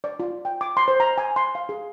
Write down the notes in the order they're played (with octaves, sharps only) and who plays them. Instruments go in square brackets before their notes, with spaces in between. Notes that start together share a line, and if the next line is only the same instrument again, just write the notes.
[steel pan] D5
F4
G5
D6
C6
C5
A#5
G#5
C6
F5
G#4